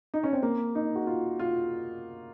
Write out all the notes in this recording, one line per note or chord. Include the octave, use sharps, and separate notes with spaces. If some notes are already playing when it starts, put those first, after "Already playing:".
D#4
C#4
C4
A#3
D#4
F#4
F4
F4